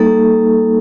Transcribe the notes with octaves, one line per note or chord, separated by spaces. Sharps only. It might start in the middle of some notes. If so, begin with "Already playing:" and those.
Already playing: G3 A#3 D#4 A4